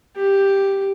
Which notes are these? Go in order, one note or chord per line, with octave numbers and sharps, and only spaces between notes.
G4